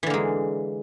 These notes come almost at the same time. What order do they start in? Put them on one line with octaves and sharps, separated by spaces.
E3 D3 A#3 G#3